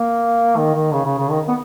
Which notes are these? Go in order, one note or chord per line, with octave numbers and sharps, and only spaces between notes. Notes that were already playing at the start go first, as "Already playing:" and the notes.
Already playing: A#3
D#3
D#3
C#3
C#3
C#3
D#3
B3